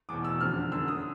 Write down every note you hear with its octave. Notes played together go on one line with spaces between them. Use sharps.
E2 B2 D6
E6
F2 D3 F6
F#2 D3 E6
D#6